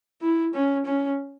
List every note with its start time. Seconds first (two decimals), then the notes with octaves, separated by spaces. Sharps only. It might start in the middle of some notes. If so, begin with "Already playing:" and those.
0.22 E4
0.54 C#4
0.86 C#4